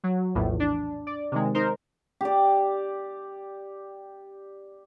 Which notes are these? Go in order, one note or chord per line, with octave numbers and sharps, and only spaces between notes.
F#3
A#1 E2 A2
D4
D5
C3 D#3 G#3
D#4 A#4 C5
G4 D5